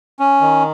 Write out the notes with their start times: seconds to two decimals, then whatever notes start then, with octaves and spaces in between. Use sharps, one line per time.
0.20 C#4
0.41 D#3